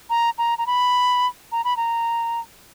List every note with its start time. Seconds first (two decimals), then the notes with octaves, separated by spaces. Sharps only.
0.10 A#5
0.38 A#5
0.58 A#5
0.67 B5
1.52 A#5
1.64 B5
1.77 A#5